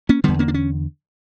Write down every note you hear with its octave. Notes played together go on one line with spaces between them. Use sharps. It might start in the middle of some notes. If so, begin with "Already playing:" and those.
A#3 C#4
E2 D3 G3 B3
A#3 C#4
D4
C#4